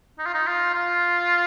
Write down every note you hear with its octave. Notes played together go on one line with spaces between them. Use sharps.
D#4
F4
D#4
F4
F4